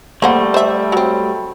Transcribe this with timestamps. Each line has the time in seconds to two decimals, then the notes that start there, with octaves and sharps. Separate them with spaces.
0.22 G3 A3 A#3 C5 F#5
0.54 C5 E5
0.92 F#3 C4